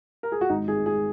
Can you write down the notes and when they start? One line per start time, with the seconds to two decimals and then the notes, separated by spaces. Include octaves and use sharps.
0.23 A#4
0.32 G#4
0.41 F#4
0.49 G#1 D#4
0.68 G#1 G#4
0.86 G#2 G#4